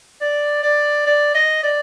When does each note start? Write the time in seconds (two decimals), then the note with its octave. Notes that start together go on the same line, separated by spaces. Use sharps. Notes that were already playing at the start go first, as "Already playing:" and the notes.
0.21 D5
0.63 D5
1.06 D5
1.35 D#5
1.63 D5